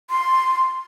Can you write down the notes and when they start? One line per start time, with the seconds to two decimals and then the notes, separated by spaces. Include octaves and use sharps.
0.10 C6